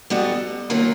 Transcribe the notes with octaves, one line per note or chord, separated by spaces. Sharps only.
G3 B3 D#4 F#4 A4
D#3 F#3 A#3 C#4 F4